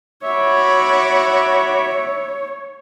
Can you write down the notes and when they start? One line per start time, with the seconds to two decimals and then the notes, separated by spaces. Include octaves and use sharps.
0.23 F#4 C#5 E5 B5 D6